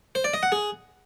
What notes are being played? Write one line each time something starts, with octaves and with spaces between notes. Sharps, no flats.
C5
D5
D#5
F#5
G#4